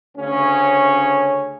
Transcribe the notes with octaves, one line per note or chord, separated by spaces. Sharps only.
D2 C#3 C#4